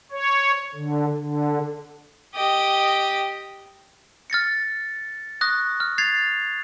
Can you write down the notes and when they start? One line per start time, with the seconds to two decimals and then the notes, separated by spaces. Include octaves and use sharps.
0.12 C#5
0.75 D3
1.18 D3
2.34 G4 D#5
4.30 F6 A6 A#6 C#7
5.41 C#6 D#6 F#6 A#6
5.80 F6
5.98 G#6 A6 C7 F7